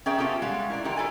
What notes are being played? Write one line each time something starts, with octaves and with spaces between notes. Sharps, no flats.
C#4 G#4 A#4 D5 E5 G5
B3 C#4 F4 G4 A4
G3 G#3 F5 F#5
E4 A#4 D5
D3 F3 D#4 G4 A#4
E4 A4 D5 G#5